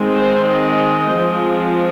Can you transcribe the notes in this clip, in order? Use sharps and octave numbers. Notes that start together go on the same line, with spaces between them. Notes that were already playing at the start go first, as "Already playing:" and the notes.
Already playing: D#3 G#3 C4
C5
D#5
F3 G#3 C4